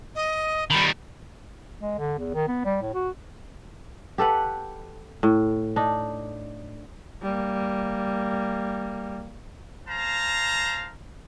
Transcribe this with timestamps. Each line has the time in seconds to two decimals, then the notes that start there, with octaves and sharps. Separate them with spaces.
0.15 D#5
0.70 D#3 G3 B5
1.82 G#3
1.98 D3
2.18 E2
2.34 D#3
2.48 B3
2.65 G3
2.82 A2
2.94 F#4
4.18 G4 A4 B4 F#5
5.23 A2
5.76 D4 D#4
7.22 G3 A#3
9.88 C5 F5 A5 A#5